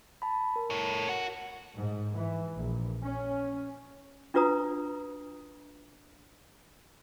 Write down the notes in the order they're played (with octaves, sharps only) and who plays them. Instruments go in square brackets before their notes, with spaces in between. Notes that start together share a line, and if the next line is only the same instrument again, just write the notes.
[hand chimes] A5 B5
A#4
[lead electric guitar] A4 C#5
F#4
[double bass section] G#2
E3
A#1
C#4
[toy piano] D4 F4 F#4 B4 A#5 D#6